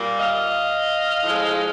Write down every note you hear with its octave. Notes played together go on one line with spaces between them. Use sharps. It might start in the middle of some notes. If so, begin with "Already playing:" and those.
Already playing: A#2 G3 A#3
D#5 F5
A2 F3 G#3